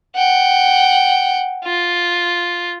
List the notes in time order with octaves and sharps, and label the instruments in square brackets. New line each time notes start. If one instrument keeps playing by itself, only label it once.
[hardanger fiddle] F#5 G5
F4